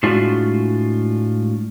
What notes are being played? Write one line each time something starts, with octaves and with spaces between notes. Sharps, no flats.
A2 G#3 D4 F4 F#4